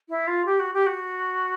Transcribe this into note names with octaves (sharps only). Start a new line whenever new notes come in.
E4
F4
G4
F#4
G4
F#4